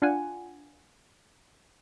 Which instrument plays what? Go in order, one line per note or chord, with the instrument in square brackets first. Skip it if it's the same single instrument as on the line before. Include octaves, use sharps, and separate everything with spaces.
[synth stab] D4 F4 F#5 G#5